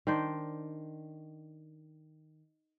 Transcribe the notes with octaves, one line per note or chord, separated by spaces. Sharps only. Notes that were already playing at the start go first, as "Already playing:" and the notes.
D#3 D4 C5 D5